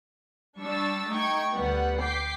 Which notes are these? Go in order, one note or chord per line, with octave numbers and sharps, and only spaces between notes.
G3 D4 C#6 E6 A6
A3 D#4 G5 C#6 G#6
D2 G3 B3 B4 F#5
G5 D6 B6 C7